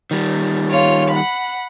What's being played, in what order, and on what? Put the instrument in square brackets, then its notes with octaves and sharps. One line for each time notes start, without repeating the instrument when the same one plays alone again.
[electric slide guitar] D#3 G3
[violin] F4 C#5
F#5 B5